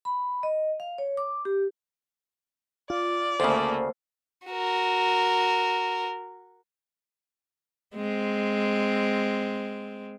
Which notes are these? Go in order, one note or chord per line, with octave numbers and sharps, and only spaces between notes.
B5
D#5
F5
C#5
D6
G4
F4 D5
D2 C#3 A3 A#3 C5
F#4 A#4
G#3 C4